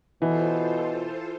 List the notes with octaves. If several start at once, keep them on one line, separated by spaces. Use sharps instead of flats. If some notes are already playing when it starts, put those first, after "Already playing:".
B2 E3 F4 A4 C5